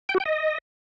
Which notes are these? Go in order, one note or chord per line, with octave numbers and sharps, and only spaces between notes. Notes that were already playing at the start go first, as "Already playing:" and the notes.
G5
F#4
G5
D#5